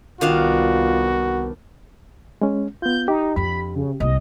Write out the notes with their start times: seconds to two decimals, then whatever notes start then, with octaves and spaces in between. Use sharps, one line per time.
0.21 C2 D#3 B3 D4 F4 F#4 F5
2.41 G#3 C#4
2.82 B3 F4 G6
3.08 D#4 G4
3.36 F2 D4 B5
3.75 C#3
4.00 C2 C4 D#5